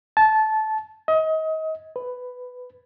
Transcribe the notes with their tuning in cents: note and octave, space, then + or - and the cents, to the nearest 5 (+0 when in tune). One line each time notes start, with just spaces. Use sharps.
A5 -15
D#5 +30
B4 +10